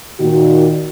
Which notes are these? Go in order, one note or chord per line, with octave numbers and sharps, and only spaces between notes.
A#2 D#3 F#4